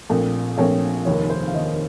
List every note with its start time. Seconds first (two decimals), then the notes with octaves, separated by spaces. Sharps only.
0.09 A#1 A#2 A3 C4
0.57 A#1 A#2 A3 C4 C#5
1.05 F1 D#2 D#3 A#3 C#5
1.30 C5
1.48 F5
1.54 F1 D#2 D#3 A#3 D#5